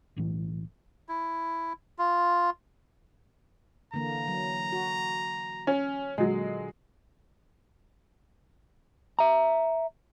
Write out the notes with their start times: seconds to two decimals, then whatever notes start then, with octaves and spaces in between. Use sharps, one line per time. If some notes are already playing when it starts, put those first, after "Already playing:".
0.16 B1 A2 E3
1.09 E4
1.98 F4
3.94 D3 E3 A#3 A#5
4.28 F#3
4.72 F#4
5.67 C#4
6.18 A#2 D3 F#3 G#3
9.19 E5 A#5